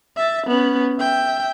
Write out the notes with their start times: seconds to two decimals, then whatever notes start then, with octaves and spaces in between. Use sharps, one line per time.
0.16 E5 A6
0.46 B3 C#4
0.99 E5 G5